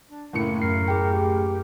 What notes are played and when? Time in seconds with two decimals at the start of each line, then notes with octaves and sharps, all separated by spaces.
0.10 D4
0.33 F#1 A2 A#3 C#7
0.62 F#2 A#4 C7
0.88 G#4 G5
1.12 G4